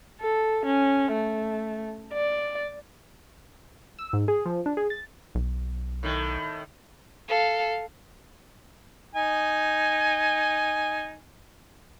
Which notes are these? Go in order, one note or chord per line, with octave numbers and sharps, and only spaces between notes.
A4
C#4
A3
D5
E6
G#2
G#4
F3
D4
G#4
A6
B1
A2 D#3
A4 F5
D#4 G#5